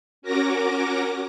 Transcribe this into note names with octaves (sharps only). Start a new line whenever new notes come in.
C#4 F#4 A#4 D6 A#6